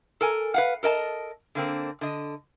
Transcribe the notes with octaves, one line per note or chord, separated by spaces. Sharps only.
A4 A#4 G#5
B4 F5 F#5
A4 A#4 D#5 A5
D3 A#3 C4
D3 D#5